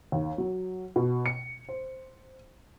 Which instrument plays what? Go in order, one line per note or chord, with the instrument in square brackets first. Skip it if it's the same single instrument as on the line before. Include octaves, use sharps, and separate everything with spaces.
[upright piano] D#2
F#3
B2
C#7
C5